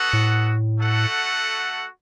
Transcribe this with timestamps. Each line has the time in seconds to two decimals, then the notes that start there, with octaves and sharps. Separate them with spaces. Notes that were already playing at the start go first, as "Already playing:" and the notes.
Already playing: B3 F#4 A4 F#5
0.13 A2
0.79 A3 F#4 A4 F#5